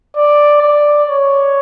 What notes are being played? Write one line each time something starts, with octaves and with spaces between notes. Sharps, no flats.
D5
D5
C#5